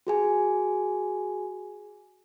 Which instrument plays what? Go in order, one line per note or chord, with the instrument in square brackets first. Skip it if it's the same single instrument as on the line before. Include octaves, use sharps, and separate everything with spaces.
[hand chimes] F#4 G#4 G#5